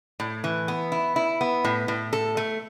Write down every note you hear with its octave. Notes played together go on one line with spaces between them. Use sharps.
A2
E3
B3
E4
E4
B3
A2
A2
A4
A3